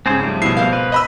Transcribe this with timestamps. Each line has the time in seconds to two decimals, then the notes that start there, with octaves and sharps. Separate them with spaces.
0.06 G#2 C#3 C4 G#4 C5
0.23 F3 G3 A3
0.42 B2 B3 E4 C7
0.57 A#4 C5 F5
0.73 B4
0.92 D#5 B5 E6